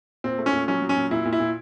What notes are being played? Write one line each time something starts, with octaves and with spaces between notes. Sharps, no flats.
A#2 C4
A3
C#4
A#2
F#3 C#4
F#3
C#4
A#2
A#2 E4
A#2
E4
A#2